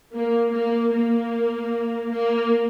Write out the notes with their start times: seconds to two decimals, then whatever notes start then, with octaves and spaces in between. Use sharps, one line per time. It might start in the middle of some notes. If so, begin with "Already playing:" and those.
0.11 A#3
0.51 A#3
0.91 A#3
2.10 A#3